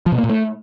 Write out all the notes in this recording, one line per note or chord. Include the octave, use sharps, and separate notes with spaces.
F3
B2
A#3
A#2
A3